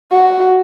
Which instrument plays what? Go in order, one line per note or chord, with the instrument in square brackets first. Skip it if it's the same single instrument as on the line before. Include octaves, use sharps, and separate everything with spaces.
[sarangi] F#4